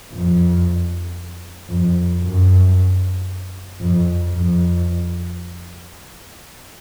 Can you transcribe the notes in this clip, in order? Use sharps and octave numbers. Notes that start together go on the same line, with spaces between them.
F2
F2
F#2
F2
F2